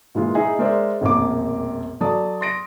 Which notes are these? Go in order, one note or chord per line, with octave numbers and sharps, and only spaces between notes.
A#2 E3 G#3 F4
D#4 E4 G#4 E5
G#3 A#4 C5 D5 E5
E1 A#1 F2 D#3 A#3 D6
F#3 A4 D5 A5 D#6
C6 A#6 D7